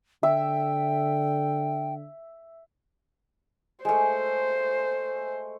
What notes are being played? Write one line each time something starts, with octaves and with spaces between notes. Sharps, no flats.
D3 E5 G5
G#3 A3 C5